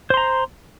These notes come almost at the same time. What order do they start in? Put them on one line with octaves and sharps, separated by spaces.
C5 C6 A#5